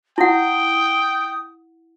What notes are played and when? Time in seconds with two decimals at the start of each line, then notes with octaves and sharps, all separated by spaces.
0.18 E4 F#5 G5 D#6